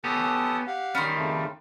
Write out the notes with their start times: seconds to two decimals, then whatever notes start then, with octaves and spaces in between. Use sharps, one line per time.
0.04 B3 C#4 G4 A4 A5 D#6
0.67 G4 F5 F#5
0.95 D#3 G3 C#4 C6
1.17 F2 C#3 A3